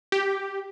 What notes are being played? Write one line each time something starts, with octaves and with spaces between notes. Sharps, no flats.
G4